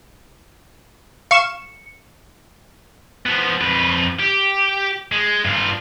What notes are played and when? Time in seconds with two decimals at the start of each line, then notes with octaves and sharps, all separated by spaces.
1.31 F5 C#6 C#7 E7
3.26 F3 B3
3.61 F2 B4
4.20 G4
5.12 G#3
5.45 G2 F4